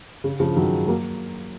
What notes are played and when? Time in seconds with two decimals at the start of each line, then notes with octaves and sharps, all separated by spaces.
0.24 C#3
0.40 C#3 F3
0.56 D#3 F#3
0.87 F#3 A#3